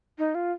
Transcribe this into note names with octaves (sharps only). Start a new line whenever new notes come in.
D#4
F4